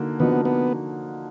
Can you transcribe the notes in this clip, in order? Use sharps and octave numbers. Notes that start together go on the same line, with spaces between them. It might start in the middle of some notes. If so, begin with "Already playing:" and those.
Already playing: D3 A#3 D#4 F#4
D3 F3 A#3 B3 D#4 F#4
B3